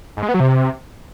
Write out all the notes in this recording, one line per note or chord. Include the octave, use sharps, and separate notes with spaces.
G#2
G#3
B3
F#3
C3